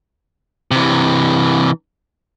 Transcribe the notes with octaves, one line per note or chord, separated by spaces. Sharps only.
C3 E3